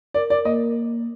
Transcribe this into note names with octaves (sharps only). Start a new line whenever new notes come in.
A#4 D5
D5
A#3 D#5